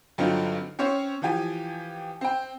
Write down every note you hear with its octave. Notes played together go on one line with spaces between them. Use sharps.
G2 D3 F#3 C4 D#4 F4
C4 C#4 C5 C#5
E3 F3 G4 G#5
C4 G5